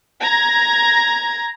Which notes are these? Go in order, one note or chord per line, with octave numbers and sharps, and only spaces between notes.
A#5 G#6